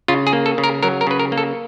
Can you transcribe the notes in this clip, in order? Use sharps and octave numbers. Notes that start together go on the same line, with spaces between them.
C#3 F4
G#4
A#3
A4
C#3
A#4
F#3 A#4
A#4
C#3 B4
A#4
A#3
A4